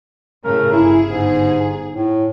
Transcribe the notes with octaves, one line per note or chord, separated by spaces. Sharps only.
A2 C#3 A3 A#4
G1 E4 G#4
G#2
A2